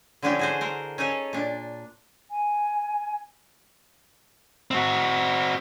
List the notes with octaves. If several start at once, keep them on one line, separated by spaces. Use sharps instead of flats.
D3 F3 C#4 D4 E4 G4
F#4 G#4 C5
A#4 C5
C#4 D#4 G#4 A4 C#5
A#2 D4
G#5
C4 F#4